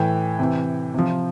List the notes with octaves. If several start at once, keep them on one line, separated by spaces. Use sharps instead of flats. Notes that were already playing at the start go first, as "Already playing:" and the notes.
Already playing: A2 E3 G5
C3 E3
C3 F3